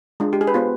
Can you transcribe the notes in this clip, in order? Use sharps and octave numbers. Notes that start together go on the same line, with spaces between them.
G#3 D4 F4
G4
G#4
B4
B3 F4 C5